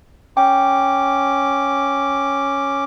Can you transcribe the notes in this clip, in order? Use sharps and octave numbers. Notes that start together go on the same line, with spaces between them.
C#4 G5 D6